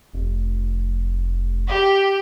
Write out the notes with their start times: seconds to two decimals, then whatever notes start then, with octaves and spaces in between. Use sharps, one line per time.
0.13 F1
1.68 G4